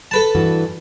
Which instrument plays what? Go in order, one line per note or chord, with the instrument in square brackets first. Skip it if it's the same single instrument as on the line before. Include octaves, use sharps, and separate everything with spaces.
[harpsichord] A4 B4 A5
[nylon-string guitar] G2 E3 F#4